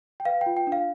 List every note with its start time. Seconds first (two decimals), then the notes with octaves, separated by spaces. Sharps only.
0.20 G5
0.25 B4 F5
0.41 G5
0.46 F4
0.57 G5
0.67 D4
0.72 F5